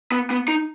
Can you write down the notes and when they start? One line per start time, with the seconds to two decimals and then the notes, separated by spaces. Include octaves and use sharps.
0.12 B3
0.30 B3
0.48 D#4